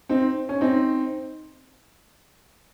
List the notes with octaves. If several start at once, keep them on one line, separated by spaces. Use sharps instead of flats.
C4 D#4
C#4
C4 D#4